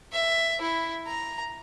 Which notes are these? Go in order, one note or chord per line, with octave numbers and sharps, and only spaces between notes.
E5
E4
A#5